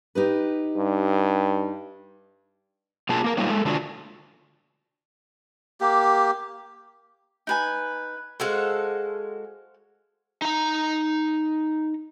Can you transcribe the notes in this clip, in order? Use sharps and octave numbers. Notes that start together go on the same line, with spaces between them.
D#4 G4 B4
G2
B2 A#3 F4 G#4 A5
A#3 A#4
G3 A#3 D#4 F4 C#5
G#3 A4
D3 D4 F4 F#4
A#3 G4
D#4 B4 G#5
G#3 F#4 A4 C5 F5 F#5
D#4 A#5